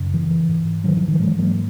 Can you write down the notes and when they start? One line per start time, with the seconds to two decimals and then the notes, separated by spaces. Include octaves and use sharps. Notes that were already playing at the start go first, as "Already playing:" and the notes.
Already playing: F#2 C#3
0.14 E3
0.49 G#2
0.84 D#3 F#3
0.97 E3
1.08 D#3 F#3
1.20 G#2 E3 G#3
1.39 F#3 A#3